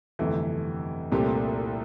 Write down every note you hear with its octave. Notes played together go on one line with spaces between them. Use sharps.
G1 F2 C3 E3 A3
C2 A#2 A3 C4 G4